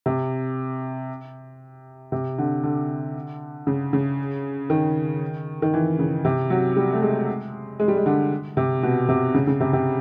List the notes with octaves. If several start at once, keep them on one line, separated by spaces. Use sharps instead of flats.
C3
C3
D3
D3
C#3
C#3
D#3
D#3
E3
C#3
C3
F#3
G3
A3
G#3
G#3
G3
G#3
D3
C3
B2
C3
C#3
C#3
C3
C3